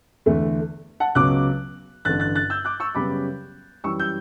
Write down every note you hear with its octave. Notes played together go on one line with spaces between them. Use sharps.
E2 D3 A3
F#5 A5
C#2 C#3 F#3 B3 D6 F#6
A1 G2 D3 F#6 A6
F#6 A6
F#6 A6
E6 G6
D6 F#6
C#6 E6
F#2 C#3 G3 B3 B5 D6
F#2 E3 G3 C#6 E6
E6 G6